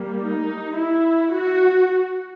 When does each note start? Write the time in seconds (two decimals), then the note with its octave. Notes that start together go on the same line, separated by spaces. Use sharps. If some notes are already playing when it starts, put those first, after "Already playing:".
Already playing: G3 A#3
0.22 D#4
0.77 E4
1.33 F#4